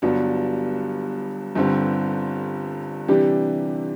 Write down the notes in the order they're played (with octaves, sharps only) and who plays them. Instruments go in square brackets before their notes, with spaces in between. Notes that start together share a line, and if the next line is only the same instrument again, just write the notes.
[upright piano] G1 G2 F#3 B3 D4
G1 G2 D3 G3 C4
C3 E3 G3 D4 G4